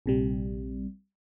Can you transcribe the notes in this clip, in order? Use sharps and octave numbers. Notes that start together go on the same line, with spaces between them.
A#1 C3 G3